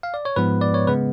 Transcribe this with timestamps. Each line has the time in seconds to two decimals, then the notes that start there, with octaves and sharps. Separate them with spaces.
0.03 F5
0.14 D5
0.25 C#5
0.36 G#2 F3 G#3 B3 B4
0.61 D5
0.74 C#5
0.87 C#3 G#3 B3 B4